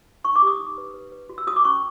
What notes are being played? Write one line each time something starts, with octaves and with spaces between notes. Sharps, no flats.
D#4 C#6
D6
G4 D#6
D#4
B4
B4
B4
F#4
E6
F#4 D#6
D6
C#4 C#6